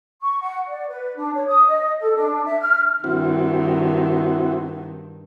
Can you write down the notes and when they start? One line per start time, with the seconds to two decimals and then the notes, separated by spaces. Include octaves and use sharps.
0.22 C#6
0.41 F#5
0.68 D5
0.88 B4
1.17 D4
1.34 C#5
1.47 D#6
1.67 D#5
2.00 A4
2.15 D4
2.45 E5
2.60 F6
3.04 G2 D#3 C4 E4 F#4